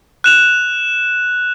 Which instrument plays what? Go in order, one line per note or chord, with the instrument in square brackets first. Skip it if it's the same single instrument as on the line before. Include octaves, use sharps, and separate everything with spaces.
[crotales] F#6 E7 F7